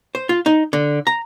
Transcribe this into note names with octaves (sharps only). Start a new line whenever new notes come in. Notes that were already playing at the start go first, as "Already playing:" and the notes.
C5
F4
D#4
D3
A#5